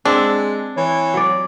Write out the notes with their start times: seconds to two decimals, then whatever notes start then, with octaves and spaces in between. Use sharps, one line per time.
0.05 G#3 C4 D4 E5
0.77 E3 C#5
1.14 F#3 D5